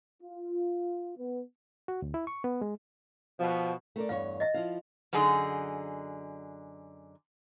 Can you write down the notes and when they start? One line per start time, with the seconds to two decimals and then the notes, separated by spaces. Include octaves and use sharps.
0.23 F4
1.18 B3
1.88 F#4
2.02 D2
2.14 E4
2.27 C#6
2.44 B3
2.61 G#3
3.40 B2 F3
3.96 A3 A#4 D5
4.09 E2 G2 C#5 F5
4.40 D#5 E5
4.54 F3 E4 F5
5.13 F#2 D3 D#4 G#4